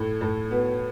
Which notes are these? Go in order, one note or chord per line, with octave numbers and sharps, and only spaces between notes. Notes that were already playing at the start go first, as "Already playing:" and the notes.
Already playing: A2 A3
A2 A3
B2 B3